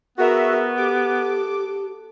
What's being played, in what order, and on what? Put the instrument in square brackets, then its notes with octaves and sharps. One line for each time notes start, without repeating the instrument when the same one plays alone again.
[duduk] B3 [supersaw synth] F#4 E5 [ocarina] G#4 [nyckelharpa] A#4
[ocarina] G4 [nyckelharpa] A4 [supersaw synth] D6